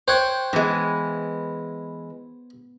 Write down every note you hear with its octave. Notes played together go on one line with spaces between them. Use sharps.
C5 C#5 G5 F#6 G#6
E3 G#3 B3